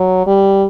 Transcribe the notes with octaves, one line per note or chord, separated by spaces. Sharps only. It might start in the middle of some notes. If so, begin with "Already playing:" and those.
Already playing: F#3
G3